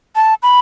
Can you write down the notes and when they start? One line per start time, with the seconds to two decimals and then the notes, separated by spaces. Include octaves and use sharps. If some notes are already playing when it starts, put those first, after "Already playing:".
0.16 A5
0.43 B5